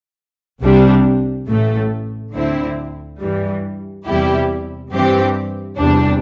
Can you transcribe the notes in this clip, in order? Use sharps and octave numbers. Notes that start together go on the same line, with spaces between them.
C2 C3 G3 D4
A1 A2 A3
D2 D3 C4 E4
G2 E3 G3
E2 C3 G3 E4 G4
G2 E3 C4 G4
E2 C3 G3 D4